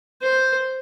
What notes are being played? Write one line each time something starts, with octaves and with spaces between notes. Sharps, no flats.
C5